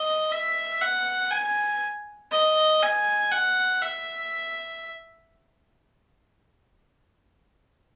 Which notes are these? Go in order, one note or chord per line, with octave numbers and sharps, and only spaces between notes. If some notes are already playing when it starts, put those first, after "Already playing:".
Already playing: D#5
E5
F#5
G#5
D#5
G#5
F#5
E5